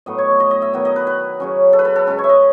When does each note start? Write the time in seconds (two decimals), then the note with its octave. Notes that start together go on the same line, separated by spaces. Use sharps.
0.06 A2 F#3 B3 D#5
0.18 C#5
0.40 D#5
0.51 D#5
0.62 E5
0.73 D#3 F#3 B3 D#5
0.85 D#5
0.96 B4
1.07 B4
1.40 C#3 F#3 C#4
1.73 A4
1.79 B4
1.85 A4
1.96 A4
2.07 C#3 G#3 C#4 A4
2.18 C#5
2.24 E5
2.29 D#5